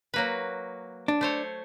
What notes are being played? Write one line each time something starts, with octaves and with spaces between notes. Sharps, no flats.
F#3 A#3 B4
D4
A3 C5 C#5